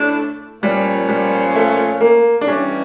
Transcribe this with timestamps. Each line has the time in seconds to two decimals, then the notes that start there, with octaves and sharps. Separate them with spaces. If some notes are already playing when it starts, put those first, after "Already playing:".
Already playing: A2 A3 D4
0.62 A#2 F3 G3 C#4 F4
1.09 G3
1.56 A3
2.01 A#3
2.41 D4
2.47 G2 E3 G3 C#4